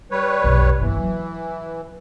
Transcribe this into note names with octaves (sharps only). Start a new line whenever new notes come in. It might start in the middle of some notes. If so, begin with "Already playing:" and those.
G3 B4 C#5
B1 F2
G1 E3 A#3
F#3